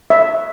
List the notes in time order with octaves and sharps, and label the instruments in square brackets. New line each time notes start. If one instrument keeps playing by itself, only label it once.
[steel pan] E5